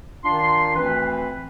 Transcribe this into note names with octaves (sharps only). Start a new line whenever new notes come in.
D#3 D4 F4 C6
D2 E3 C4 B4